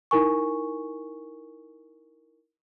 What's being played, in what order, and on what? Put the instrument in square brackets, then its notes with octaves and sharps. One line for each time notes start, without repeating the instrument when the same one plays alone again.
[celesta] D#4 E4 A#4 G#5 C#6